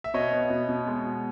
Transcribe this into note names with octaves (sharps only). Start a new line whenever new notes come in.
E5
B2 C#5 D#5
B3
B2
B2
G#3
B2